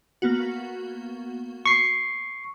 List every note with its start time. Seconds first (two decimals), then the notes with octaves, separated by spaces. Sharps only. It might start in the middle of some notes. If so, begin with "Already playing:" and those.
0.22 A#3 B3 F#4
1.66 C#6 C7